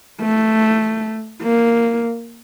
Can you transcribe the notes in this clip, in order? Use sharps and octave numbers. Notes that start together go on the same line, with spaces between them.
A3
A#3